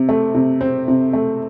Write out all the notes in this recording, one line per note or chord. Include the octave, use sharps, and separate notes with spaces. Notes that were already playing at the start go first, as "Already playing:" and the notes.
Already playing: C3
A3
C3
C4
C3
A3